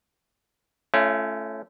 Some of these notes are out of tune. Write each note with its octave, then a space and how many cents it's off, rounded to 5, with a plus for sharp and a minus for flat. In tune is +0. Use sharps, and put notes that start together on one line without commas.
A3 +0 C#4 +0 F4 -40